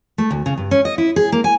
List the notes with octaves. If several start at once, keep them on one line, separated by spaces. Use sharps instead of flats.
A3
D2
C#3
G2
C#4
D#5
E4
G#4
A#3
G#5